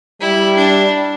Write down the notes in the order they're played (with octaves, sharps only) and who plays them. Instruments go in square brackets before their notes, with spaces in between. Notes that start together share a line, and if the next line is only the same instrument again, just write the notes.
[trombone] G3 [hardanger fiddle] E4
[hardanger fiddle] D4